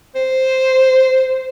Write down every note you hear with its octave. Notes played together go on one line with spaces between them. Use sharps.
C5